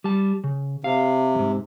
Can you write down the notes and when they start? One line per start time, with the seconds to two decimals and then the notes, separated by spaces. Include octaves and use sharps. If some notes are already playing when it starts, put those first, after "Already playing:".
0.04 G3 A5
0.44 C#3
0.84 C3 F5
1.35 F2 G#2